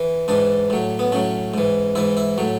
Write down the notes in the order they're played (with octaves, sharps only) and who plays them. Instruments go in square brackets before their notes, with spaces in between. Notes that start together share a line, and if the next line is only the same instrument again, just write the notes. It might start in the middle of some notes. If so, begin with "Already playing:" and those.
Already playing: [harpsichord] E3
G#2 E3 D4
A2 F#3
B3
A2 F#3 C#4
G#2 E3
G#2 E3 E4
E4
A2 F#3